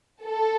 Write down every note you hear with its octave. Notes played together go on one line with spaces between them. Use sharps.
A4